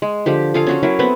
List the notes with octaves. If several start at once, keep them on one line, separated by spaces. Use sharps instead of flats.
G#3
D3 F3 G4
F4 G#4 A4 F5
C#4 F#4 A4
F#3 E4 A#4
B3 C4 A4 B4